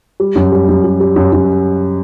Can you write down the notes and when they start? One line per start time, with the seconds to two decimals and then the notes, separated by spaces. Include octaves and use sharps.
0.20 G3
0.36 F#2
0.52 G3
0.69 F#2
0.84 G3
1.00 G3
1.16 F#2
1.33 F#2